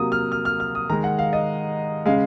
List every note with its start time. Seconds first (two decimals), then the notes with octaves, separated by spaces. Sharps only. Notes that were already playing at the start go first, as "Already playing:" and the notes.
Already playing: C3 F#3 A#3 D#6
0.12 F6
0.32 F6
0.45 F6
0.60 F6
0.75 D#6
0.90 D#3 G#3 A#5
1.04 F#5
1.19 F5
1.33 D#5
2.06 C#3 G#3 F5